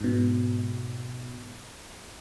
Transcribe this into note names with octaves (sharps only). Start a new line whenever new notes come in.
G#2 B2